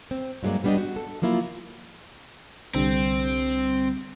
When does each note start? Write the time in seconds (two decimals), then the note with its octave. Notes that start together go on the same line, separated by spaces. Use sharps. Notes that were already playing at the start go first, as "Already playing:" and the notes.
0.11 C4
0.43 G2 F#3 G#3 A#3 D5
0.64 G3 B3 D4 F#4 G4 D#5
0.78 F#4
0.96 A4
1.22 F3 F#3 A#3 E4 F4
2.75 C2 D3 G3 C4